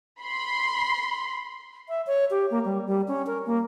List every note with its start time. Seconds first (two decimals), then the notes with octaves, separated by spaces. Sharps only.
0.22 B5 C6
1.89 E5
2.07 C#5
2.30 G4
2.51 A#3
2.65 G3
2.87 G3
3.08 C#4
3.27 A#4
3.46 A#3